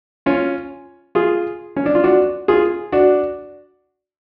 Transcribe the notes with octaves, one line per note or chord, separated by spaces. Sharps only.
C#4 F4
F4 G#4
C#4
D4
F4
D4 F#4
F4 G#4
D4 F#4